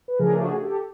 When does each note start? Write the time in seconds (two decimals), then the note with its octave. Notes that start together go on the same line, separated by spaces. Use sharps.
0.08 B4
0.19 C#3 F3 A3 D4 G#4 A#4
0.40 F#4 G#4
0.62 G4 A4